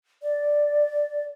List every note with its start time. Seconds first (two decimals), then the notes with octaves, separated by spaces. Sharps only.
0.22 D5